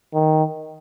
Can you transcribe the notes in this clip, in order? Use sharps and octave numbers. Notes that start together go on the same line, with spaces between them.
D#3